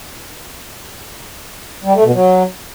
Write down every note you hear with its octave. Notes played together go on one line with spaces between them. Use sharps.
G3
A3
B2
F#3